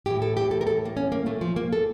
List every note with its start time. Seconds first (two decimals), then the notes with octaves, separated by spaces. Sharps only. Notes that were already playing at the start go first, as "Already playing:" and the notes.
0.06 A2 E3 G4
0.22 A4
0.37 G4
0.51 A4
0.61 A#4
0.67 A4
0.85 A#3
0.97 C#4
1.12 A#3
1.26 A#2 A3
1.41 F3
1.56 A#3
1.73 A4